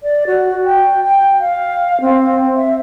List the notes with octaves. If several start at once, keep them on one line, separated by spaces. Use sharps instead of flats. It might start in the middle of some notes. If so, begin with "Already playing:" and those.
D5
F#4
G5
G5
F5
C4
E5